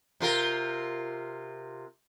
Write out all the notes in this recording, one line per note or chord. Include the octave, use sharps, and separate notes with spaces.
C3 F4 A#4